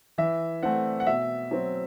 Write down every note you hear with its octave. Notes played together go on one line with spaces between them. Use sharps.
E3 E5
A3 C4 F#5
F#5
B2 E5
F#3 C4